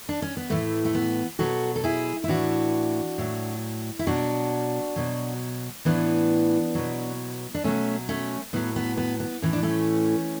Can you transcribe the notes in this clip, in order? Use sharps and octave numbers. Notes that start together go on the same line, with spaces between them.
D4
C#4
B3
A2 E3 A3
A3
B3
B2 F#3 F#4 A4
A4
E4 G#4
E4
A2 E3 D4 F#4
A2 F#3
E4
B2 F#3 D4 F#4
B2 F#3
A2 E3 B3 D4
B2 F#3
D4
B2 F#3 A3 C#4
A3 C#4
A2 F#3 B3
B3
B3
B3
A2 E3 C#4
D4
A3 C#4